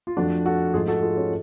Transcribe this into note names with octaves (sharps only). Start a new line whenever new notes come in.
F4
F2 F3 A3 D4 F#4
F#4 A4
G#2 F3 A3 F4 G#4
F#4 A4
F4 G#4
C#4 F4